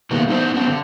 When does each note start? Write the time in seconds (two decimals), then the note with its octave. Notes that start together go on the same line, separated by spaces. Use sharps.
0.11 B2 D#3 G#3 A#3 B3
0.28 B3 D#4 A4 B4 C5
0.54 B3 C4 D4
0.68 D3